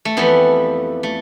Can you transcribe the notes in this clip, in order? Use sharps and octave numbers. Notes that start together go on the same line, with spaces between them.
A3
F2 E3 G3 B3
A3